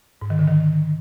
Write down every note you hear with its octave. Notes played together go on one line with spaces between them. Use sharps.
G#2
D#3
D3
D#3